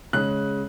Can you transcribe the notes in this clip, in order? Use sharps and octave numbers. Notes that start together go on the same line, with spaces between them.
C#3 G#3 C#4 F#6